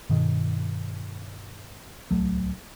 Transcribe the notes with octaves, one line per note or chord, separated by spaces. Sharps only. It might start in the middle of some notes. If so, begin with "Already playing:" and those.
G2 B2 D#3
D1 C2 F#3 A3